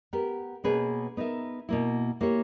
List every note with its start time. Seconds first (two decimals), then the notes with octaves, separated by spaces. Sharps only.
0.13 B3 G4 A#4
0.64 B2 A#3 C#4 G#4 B4
1.17 B3 D#4 A#4 E5
1.69 B2 A#3 E4
2.21 A#3 E4 G4 C#5